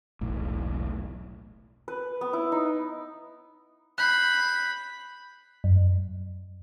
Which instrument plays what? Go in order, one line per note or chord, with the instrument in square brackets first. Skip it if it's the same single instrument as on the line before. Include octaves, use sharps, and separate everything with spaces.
[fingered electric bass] E1 B1 A2
[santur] B4
B3
E4
D#4
[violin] B5 [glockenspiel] F#6 G6 C7
[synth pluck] F#2